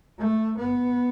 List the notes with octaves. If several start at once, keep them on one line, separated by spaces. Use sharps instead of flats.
A3
B3